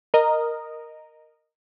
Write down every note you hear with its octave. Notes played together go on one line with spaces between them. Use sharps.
A#4 D#5